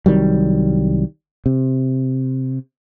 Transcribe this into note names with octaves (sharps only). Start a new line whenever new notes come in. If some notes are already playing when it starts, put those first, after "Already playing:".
C2 D#3 F#3 G3
C3